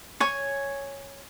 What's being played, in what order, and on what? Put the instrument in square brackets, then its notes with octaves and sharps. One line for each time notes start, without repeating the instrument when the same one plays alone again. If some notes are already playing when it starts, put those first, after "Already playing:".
[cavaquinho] C#5 G#5 C#6